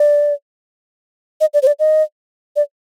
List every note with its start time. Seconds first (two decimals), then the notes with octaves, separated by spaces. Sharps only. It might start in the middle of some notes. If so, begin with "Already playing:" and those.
Already playing: D5
1.41 D#5
1.54 D5
1.63 C5
1.67 D5
1.79 D#5
2.56 D5